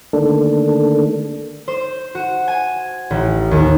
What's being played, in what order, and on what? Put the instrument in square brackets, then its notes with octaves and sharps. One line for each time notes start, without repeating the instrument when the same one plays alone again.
[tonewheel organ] D3 D#3 A3 A#3 D4 A4
[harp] C5
F#4
G#5
A1
D#2